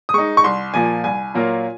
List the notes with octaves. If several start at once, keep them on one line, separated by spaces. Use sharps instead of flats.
D#6
G#3 D#4 C#6
C#6
C2 C6
A#2 F3 A#3 G#5
C2 G#5
A#2 F#3 A#3 F4